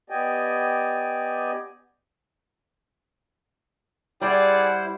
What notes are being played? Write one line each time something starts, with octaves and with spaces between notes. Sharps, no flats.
B3 G4 D5 D#5 G5 G#5
G3 E4 G#4 C5 D5 F#5